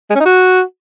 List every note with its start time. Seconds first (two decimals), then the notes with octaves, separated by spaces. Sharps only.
0.10 G#3
0.15 C#4
0.20 D#4
0.25 F#4